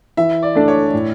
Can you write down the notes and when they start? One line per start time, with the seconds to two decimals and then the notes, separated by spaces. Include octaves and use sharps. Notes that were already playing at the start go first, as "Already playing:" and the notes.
0.17 E3 E5
0.43 D5
0.55 A3 D4
0.68 C#5
0.94 A2